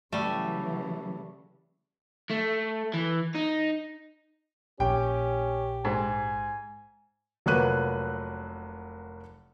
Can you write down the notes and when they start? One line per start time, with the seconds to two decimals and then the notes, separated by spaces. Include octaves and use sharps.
0.12 C#3 E3 F#3 G3 A3
2.30 A3
2.94 E3
3.35 D#4
4.80 A#1 C#4 G4 G5
5.85 G#2 G#5
7.46 F1 F#3 A#3 B4 F#6 D#7